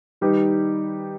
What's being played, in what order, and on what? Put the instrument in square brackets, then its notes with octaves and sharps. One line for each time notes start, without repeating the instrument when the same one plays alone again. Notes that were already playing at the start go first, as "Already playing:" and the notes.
[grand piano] D#3 G3 D#4 G4 B4